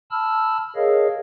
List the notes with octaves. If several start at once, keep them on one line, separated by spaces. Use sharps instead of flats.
A5 B5 E6 F6
G#4 A#4 C#5 D#5 F5